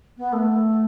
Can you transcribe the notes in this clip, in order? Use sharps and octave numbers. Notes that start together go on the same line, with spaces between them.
B3
A3